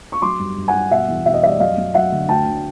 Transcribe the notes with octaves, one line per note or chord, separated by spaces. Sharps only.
C#6
F#3 C6 D6
G2
G2
F#5 G#5
G2
B2 E5 F#5
E2
B2 E5
D#5
G3 D5 E5
F#2 D#5 F5
F#2
F#3 E5 F#5
D3
D2 G5 A5
D3